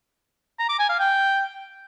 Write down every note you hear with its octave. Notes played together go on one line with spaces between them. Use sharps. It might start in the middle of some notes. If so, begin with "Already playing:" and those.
A#5
D6
G#5
F5
G5